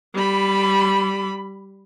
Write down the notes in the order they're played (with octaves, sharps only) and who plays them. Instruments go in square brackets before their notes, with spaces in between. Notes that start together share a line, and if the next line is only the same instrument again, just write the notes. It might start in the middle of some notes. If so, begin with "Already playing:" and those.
[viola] G3 B5